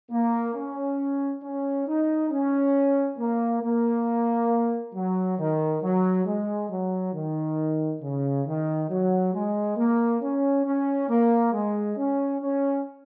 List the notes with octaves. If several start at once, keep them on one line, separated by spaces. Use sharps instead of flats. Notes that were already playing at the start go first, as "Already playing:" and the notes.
A#3
C#4
C#4
D#4
C#4
A#3
A#3
F#3
D#3
F#3
G#3
F#3
D#3
C#3
D#3
F#3
G#3
A#3
C#4
C#4
A#3
G#3
C#4
C#4